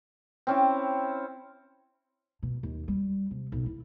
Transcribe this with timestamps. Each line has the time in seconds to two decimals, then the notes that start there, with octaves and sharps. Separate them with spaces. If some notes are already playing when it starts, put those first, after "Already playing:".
0.47 C4 C#4 E4
2.43 B2
2.63 D#2
2.88 G3
3.31 C3
3.52 B1
3.66 E4